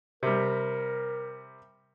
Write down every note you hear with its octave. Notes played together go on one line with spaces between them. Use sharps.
C3 G3 A#4